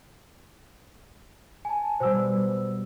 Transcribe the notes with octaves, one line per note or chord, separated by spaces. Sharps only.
G#5 A5
B2 G3 C5 E6